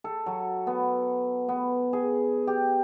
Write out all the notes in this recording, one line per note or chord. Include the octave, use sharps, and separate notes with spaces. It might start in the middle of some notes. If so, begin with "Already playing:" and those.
A4
F#3
B3
B3
G#4
G4